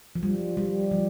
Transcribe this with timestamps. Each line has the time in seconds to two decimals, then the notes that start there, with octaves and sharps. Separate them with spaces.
0.15 F3
0.23 G3
0.57 G3
0.91 F3